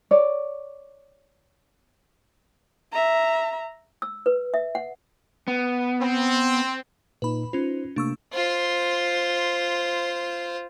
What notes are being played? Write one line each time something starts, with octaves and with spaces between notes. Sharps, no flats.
C#5 D5
E5 A#5
E6
B4
E5
F#5
B3
C4
A#2 A#3 D#4 B4 B5
C#4 D#4 F4 C5
C3 A3 A#3 D4 C#6 E6
F4 C5